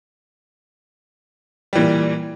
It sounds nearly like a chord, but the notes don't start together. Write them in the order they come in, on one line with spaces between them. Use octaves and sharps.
G3 E3 A#2